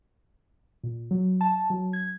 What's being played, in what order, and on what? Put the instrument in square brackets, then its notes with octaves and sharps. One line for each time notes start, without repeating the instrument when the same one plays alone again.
[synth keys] A#2
F#3
A5
F#3
G#6